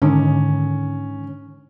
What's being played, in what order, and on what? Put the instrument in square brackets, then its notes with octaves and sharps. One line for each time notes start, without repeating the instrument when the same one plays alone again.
[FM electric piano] G#2 D3 D#3 [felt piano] C#4